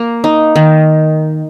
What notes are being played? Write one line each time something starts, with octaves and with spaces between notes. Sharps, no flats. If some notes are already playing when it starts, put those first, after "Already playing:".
Already playing: A#3
D#4
D#3